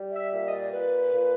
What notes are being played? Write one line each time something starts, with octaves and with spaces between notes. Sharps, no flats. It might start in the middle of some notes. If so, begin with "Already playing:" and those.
Already playing: G3
E5
A#2 E5
D#5
D5
A#2 B4
A#2